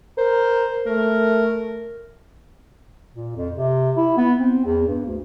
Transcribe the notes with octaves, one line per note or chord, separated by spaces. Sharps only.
A#4 C5
A3 A#4
A#2
F2
C3
E4
B3
C4
E2
G2
D2